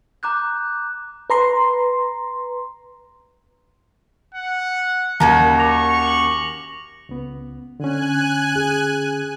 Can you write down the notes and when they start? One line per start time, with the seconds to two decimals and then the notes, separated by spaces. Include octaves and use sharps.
0.23 A#5 D6 F#6 G6
1.30 B4 A#5 C6
4.34 F#5
5.20 D#2 C#4 F#4 A#4
5.58 C#6 D6 A#6 F7
6.03 F7 F#7
7.09 C#2 B3
7.80 D3 C#4 G#5 F#6
8.56 G#4